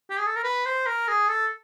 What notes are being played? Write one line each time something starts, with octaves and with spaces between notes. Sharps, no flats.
G4
G#4
A4
A#4
B4
C5
A#4
G#4
A4